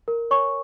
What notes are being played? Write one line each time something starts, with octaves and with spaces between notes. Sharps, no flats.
A#4
C#5 G#5 C#6